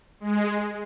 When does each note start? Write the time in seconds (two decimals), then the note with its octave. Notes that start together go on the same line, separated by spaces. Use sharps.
0.20 G#3